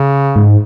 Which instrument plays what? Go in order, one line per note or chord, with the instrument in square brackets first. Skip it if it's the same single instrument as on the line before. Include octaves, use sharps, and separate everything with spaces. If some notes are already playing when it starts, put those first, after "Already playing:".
Already playing: [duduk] C#3
[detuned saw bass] G#2